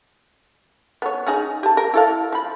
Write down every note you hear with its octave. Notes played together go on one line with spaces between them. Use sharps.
B3 C#5
C#4 D#4 G#4
G4 A5
A#4
E4 A4 F5
F3 B5